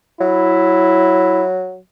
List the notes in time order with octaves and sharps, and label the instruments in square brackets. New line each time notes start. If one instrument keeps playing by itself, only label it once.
[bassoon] F#3 [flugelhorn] E4